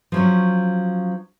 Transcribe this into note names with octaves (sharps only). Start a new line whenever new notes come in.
F3 F#3 C#4